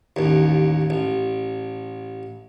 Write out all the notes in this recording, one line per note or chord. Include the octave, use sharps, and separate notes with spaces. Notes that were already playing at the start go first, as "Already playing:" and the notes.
A1 D#2
A1